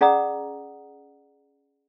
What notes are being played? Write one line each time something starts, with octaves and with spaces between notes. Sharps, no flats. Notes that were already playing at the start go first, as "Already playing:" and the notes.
C#4 G#4 D5 F#5 A#5 D#6